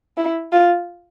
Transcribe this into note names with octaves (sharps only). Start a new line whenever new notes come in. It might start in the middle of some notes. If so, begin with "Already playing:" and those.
E4
F4